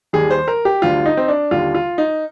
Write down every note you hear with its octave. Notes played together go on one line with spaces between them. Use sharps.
D#2 D#3 G3 G#4
C5
A#4
G4
D2 D3 G3 F4
D#4
C4
D4
D#2 D3 G3 F4
F4
D#4